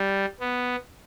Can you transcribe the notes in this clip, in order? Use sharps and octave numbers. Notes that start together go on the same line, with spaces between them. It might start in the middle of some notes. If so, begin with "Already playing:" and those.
Already playing: G3
B3